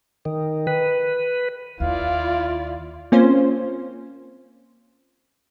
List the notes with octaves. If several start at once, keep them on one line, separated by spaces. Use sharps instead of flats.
D#3
B4
D#2 E4 F4 D5 F5
A#3 C4 C#4 F4 C5